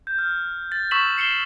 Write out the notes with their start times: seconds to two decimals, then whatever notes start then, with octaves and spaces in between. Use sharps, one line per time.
0.07 G6
0.18 F6
0.72 A6
0.91 C#6 E6 B6 E7 F#7
1.18 C7 C#7 E7 G7